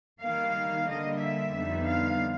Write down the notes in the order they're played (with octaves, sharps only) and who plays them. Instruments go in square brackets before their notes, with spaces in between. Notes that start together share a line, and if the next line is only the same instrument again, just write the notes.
[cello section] D#3 G3 A#3 F5
D3 G3 A#3 D#5
E5
F2 D3 G3 B3 D#4
F5